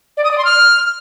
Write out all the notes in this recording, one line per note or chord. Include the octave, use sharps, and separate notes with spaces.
D5
D#6
D5
C6
F6